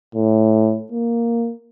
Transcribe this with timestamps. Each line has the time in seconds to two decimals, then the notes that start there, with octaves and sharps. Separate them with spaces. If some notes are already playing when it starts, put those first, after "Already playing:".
0.15 A2
0.92 A#3